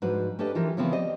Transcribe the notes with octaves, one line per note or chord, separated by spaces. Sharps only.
G#2 F3 D4 F#4 B4
C#4 D4 G4 A4 B4 D#5
E3 F3 F4 G4 A#4
C#3 E3 F3 B3 C4 G5
G4 C5 D5 D#5